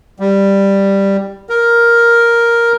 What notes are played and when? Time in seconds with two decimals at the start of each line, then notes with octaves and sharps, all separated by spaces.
0.19 G3
1.49 A#4